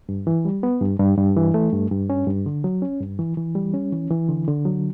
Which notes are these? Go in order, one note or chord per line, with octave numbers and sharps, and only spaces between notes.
G2
E3
G3
B3
G2
G2
G2
E3
A3
G2
G2
C#4
G2
D3
F#3
C#4
G2
E3
E3
G3
C#4
E3
E3
D3
D3
F#3